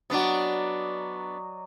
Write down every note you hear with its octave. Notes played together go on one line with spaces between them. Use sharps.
F#3 B3 D4 D5 D#5